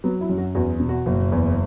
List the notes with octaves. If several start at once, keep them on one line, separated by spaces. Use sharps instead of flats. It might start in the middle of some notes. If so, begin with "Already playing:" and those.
F#3 B3
E4
F#2
F#4
E2 F#4
B2
F#4
F#1
E2